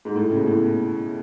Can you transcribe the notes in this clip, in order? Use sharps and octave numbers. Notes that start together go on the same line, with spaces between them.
G#2
A2
C#3
B2
A2